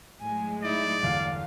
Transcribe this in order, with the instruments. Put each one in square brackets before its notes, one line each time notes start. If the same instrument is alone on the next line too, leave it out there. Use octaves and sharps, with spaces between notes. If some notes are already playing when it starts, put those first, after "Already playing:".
[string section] A2 F#3 G#3 [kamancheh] G#5
[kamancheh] D#4 E4 [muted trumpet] D5
[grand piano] G1 E2 [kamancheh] F5